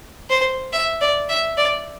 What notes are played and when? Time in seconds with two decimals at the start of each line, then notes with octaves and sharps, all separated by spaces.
0.30 C5
0.72 E5
1.01 D5
1.29 E5
1.57 D5